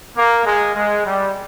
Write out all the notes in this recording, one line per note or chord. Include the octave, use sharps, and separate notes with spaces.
A#3
G#3
G#3
G3